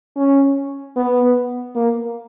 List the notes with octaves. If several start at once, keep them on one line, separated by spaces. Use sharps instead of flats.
C#4
B3
A#3